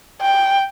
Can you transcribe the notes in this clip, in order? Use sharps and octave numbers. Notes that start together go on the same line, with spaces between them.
G5